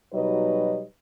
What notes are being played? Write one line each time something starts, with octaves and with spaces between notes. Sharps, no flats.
B2 F#3 G3 D#4 B4 D#5